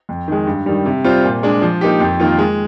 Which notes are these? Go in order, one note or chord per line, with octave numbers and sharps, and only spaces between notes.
F2
D#3 G#3
G2
D#3 G3
C3
G3 C4 F4 C5
A#2
G#3 D4
F3
A#3 D#4 G4
F2
D#3 A#3 F4
G#3